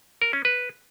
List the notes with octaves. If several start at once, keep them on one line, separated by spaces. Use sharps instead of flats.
A#4
C#4
B4